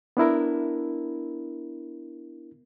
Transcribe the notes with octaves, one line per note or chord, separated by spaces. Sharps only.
B3 D4 E4 A#4